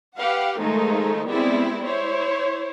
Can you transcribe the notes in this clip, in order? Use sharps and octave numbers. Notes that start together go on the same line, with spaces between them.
G4 B4 F5 F#5
D#3 F3 G#3 A3 D#4
G3 G#3 B3 C4 E4
E4 C5 C#5